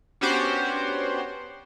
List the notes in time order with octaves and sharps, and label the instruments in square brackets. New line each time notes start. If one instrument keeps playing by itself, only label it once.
[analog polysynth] B3 C#4 D4 F#4 G4 C5